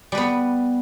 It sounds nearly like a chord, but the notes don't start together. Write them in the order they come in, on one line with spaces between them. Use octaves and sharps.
G3 B4 B3